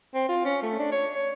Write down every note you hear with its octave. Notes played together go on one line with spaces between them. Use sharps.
C4
F4
C#4
A3
D4
C#5
C#5